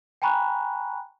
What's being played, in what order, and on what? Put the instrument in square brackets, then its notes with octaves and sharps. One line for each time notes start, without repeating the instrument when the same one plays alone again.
[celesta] G5 G#5 A#5 B5 C#6 F#6